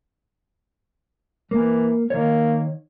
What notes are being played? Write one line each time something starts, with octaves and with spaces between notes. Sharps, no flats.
E3 A#3
D#3 A#3 C#5